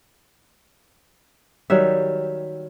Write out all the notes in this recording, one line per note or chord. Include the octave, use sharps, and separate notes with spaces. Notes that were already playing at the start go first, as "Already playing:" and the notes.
D#3 F#3 G3 E5